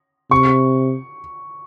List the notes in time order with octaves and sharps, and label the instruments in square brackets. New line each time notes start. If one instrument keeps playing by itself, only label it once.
[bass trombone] C3 [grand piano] C#6